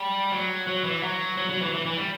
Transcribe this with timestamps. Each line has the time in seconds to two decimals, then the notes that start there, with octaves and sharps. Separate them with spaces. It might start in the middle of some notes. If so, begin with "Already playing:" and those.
Already playing: G3
0.32 F#3
0.67 F#3
0.84 E3
1.03 F#3
1.37 F#3
1.50 F#3
1.62 E3
1.74 E3
1.86 E3
1.97 G3